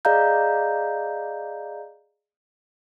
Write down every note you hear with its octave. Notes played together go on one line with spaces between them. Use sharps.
G#4 D5 D#5 F5 A#5 G6